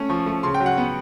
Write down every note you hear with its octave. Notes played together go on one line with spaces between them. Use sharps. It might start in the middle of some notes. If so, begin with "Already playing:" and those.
Already playing: A3 C#4
F3 C#6
A3
C#3 C6
G5
F#3
F#5
B3